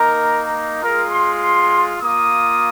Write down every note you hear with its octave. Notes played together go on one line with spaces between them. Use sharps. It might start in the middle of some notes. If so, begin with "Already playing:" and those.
Already playing: A#3 D#4 A#4
G#3 F4 A#4
C6
C6
A#3 F4 D#6